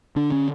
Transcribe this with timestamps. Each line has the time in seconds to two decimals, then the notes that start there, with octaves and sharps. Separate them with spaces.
0.16 D3 D4
0.32 C#4